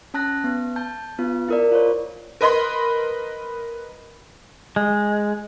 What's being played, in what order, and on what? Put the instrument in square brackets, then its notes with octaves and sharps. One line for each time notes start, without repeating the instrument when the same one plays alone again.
[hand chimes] C#4 A5 F#6 A#6
B3
A5 G6
B3 F4
E4 A#4 D5
F4 C5 C#5
[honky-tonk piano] A#4 B4 D#5 B5 C6
[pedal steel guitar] G#3